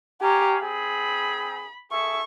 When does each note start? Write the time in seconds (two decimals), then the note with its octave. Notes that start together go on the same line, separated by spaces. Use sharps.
0.22 G4 C#5 F5 G#5 A#5
0.61 C4 G#4 B5
1.92 G#4 A4 E5 C#6